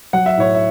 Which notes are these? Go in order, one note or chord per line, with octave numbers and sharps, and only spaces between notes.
F#3 F#5
E5
A2 C#5
E5